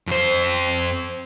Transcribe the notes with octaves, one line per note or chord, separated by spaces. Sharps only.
F2 C5